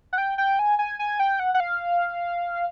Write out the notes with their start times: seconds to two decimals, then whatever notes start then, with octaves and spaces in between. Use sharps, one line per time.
0.13 F#5
0.18 G5
0.38 G5
0.59 G#5
0.79 G#5
0.99 G#5
1.20 G5
1.40 F#5
1.54 F#5
1.60 F5